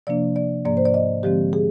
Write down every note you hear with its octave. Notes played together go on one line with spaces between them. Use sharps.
C3 F3 A#3 D4 D5
D5
G#2 F3 A#3 D5
C5
D5
D#5
D3 F3 G#3 C4 G4
G#4